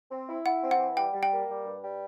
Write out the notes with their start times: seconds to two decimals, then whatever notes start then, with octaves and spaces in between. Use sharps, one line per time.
0.11 C4
0.28 E4
0.45 E4 F#5
0.62 C4
0.71 F#5
0.79 E3
0.96 G3 G5
1.13 G3
1.23 G5
1.31 A#3
1.48 G3
1.65 G2
1.82 G3